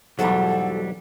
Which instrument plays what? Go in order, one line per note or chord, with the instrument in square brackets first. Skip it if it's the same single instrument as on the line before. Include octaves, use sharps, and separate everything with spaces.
[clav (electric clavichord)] B1 E2 G#2 [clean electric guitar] F#3 G3 [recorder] A4 [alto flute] F#5